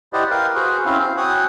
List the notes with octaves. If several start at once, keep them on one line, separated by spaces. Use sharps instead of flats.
E4 G4 C5 D5 D#5 F#5
A#4 B4 F5 G5
F#4 G#4 B4 C5
C4 C#4 E4 F5
C4 C5
F#4 C#5 G5 G#5 D#6 F#6